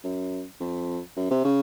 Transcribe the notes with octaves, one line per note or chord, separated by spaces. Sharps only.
F#2
F2
F#2
C3
C#3